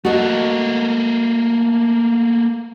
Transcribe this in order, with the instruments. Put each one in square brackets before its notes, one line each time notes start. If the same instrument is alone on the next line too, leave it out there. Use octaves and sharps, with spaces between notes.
[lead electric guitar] A3 A#3 [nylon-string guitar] F#4 D#5